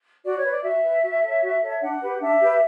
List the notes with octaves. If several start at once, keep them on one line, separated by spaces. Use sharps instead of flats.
F#4 D5
C#5
B4
D5
F#4 E5
B4
F#4
A4 C#5
F#4
A4 C#5
D4 F#5
G4 B4
D4 E5
G4 B4